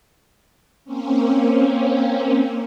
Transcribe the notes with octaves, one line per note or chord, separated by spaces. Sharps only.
A#3 C4 C#4